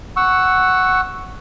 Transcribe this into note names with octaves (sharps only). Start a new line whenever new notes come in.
F#5 C#6 E6